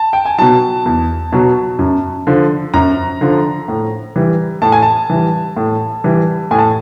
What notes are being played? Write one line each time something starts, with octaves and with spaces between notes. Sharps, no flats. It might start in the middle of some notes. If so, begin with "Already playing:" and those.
Already playing: A5
G5
G#5
B2 F#3 A5
E2
B2 F#3
F#2
D3 F3
F#2 A#5
D3 F3
A2
E3 G3
A2 A5
G#5
A5
E3 G3
A2
E3 G3
A2 G#5
A5